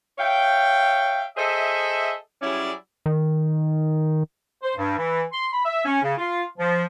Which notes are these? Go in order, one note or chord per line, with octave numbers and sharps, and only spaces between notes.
C#5 E5 F5 G5
G#4 A4 C5 D#5 E5
F#3 G3 C#4 E4 G#4 D5
D#3
C5
G2
E3
C6
B5
E5
C#4
C#3
F4
F3